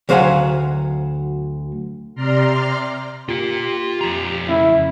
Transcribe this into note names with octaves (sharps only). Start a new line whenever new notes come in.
D2 F#3 C5 F5 F#5 G#5
C3 D5 A#5 C6 F6
F4 G4 A#5
F2 A#5
C#3 A3 C#4 E4